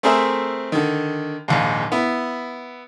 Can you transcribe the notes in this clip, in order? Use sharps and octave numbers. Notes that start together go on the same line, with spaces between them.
A3 C4 G#4 A#4 C5 E5
D3 D#3
A#1 D#2 G#2
B3 E4